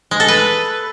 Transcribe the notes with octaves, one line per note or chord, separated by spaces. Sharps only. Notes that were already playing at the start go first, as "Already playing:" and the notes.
G#3
A4
B4